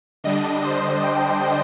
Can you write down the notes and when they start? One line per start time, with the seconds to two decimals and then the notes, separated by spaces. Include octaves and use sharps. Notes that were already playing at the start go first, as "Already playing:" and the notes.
0.24 D3 G3 D4 D#5
0.64 C5
1.02 G5